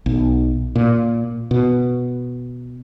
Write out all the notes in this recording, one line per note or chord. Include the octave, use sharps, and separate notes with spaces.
B1
A#2
B2